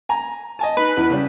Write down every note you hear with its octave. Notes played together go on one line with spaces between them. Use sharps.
G#5 A#5
D#5 G#5 A5
D#4 B4
E2 E3
C#3 G3